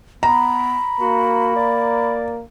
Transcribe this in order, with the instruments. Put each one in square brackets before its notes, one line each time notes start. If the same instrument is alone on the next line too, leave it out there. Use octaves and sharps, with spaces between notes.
[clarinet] B3 [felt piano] A#5 [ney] B5
[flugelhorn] A#3 [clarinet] F#4
[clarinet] D5